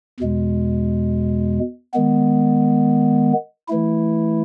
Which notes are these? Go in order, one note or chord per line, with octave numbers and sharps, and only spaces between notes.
E2 B2 G#3
D#3 G#3 B3
E3 A3 E4